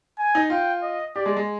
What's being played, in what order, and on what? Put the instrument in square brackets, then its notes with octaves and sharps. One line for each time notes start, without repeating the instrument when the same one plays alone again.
[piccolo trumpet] G#5
[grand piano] D#4
[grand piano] F4 [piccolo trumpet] G5
[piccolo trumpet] D#5
[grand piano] G4 [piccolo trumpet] D5
[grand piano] G#3
G#3